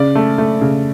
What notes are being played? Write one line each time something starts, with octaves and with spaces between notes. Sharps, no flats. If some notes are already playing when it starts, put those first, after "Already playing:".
Already playing: C#3 D5
A3
A3
C#3